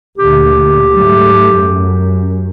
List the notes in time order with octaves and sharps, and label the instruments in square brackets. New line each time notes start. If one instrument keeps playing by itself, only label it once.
[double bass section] D2 A#2 D3 [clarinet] G4
[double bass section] G#2 F#3 A3
F#2